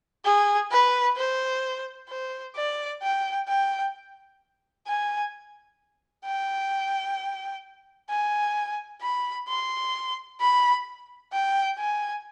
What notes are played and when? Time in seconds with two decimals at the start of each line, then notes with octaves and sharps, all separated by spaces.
0.24 G#4
0.71 B4
1.16 C5
2.09 C5
2.56 D5
3.02 G5
3.48 G5
4.87 G#5
6.25 G5
8.09 G#5
9.01 B5
9.48 C6
10.40 B5
11.32 G5
11.78 G#5